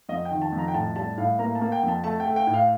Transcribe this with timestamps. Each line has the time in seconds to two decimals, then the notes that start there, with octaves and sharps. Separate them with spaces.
0.09 F2 D#5
0.25 G5
0.31 D#3
0.42 A5
0.52 F2
0.58 A#5
0.68 G5
0.74 A2 A5
0.96 G3 A5
1.18 A2 F5
1.39 A#3 A#5
1.55 A5
1.61 A#3
1.72 G5
1.83 F2
1.88 A5
2.04 A3 A5
2.20 G5
2.26 A3
2.36 G5
2.47 A2
2.54 F5